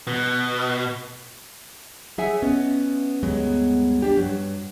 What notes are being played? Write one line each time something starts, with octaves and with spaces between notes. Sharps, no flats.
B2
F#3 G#4 E5 F#5 G#5
B3 C#4 D#5
D2 G2 F#3 G#3 B3
D4 G4
G2 F#3